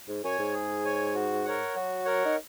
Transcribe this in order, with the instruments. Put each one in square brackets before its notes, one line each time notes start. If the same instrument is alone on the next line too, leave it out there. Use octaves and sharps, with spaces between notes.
[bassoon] G#2
[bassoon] F#2 [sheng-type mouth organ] C#5 G#5
[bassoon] G#2
[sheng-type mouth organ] G#4
C#5 G#5
F#4
A#4 C#5 F#5
[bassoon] F#3 [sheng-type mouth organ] F#4
[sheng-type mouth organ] A#4 C#5 F#5
[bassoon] D#4